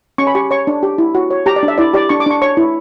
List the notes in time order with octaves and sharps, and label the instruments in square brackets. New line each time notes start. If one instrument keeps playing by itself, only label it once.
[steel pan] C#4 C#6
B5
G4 C#6
C#5 C#6
D4
G4
E4
F#4
C#5
G4 A#5
D5
D4
E5
E4 D5
G4 D5
D4 C#6
D6
D4 C#6
C#5 C#6
E4